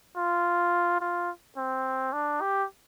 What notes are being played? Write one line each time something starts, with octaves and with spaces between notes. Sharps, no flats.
F4
F4
C4
D4
G4